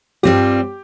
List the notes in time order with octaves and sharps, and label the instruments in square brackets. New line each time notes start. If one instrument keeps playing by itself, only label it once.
[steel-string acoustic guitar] G2 G3 C4 F4 [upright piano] G4